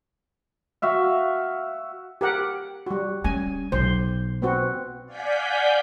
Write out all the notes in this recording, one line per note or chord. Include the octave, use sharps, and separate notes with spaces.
F#4 E5 F5
G4 A#4 F#5
G3 F#4
G3 C#4 G#5
B1 C5
B3 C4 F#4
D5 F5 F#5 G#5 G6 B6